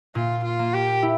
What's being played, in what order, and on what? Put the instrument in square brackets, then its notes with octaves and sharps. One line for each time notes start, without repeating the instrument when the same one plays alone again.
[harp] A#2 [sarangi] F4
[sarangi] F4
[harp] A#3
[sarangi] G4
[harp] E4